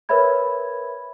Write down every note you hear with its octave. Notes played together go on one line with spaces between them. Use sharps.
A#4 B4 C#5 E5 B5 G#6